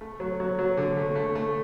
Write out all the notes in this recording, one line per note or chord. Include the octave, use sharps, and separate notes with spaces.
A3
F#3
F#3
F#3
D3
A3
A3
A3